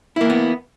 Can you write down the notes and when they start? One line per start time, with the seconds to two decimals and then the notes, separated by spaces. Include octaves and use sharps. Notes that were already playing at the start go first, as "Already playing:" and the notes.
0.16 E4
0.21 A#3
0.25 E3
0.30 B3